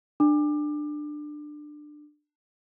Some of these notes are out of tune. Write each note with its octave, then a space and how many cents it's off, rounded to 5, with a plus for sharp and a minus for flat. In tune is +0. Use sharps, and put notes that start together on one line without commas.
D4 +20 D6 +25